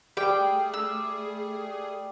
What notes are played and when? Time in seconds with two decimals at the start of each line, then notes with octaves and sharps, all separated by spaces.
0.17 G3 A3 G#4 G5
0.74 E6